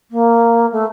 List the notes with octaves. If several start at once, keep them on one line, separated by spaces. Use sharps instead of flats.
A#3
A3